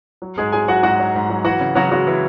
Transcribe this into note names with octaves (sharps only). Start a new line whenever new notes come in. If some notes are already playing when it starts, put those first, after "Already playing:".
F#3
G#2 G#3 G#4
F#3 G#4 G#5
F#3 F#4 F#5
G#2 F#4 F#5
F#3
G#2
F#3
E3 F#4 F#5
C#3
C#3 F#3 F#4
F#3 G#3 F#4
E3 E4